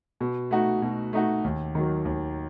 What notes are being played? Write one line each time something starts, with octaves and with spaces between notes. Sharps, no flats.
B2
A3 D#4 F#4
B2
A3 D#4 F#4
D#2
D#3 F#3
D#2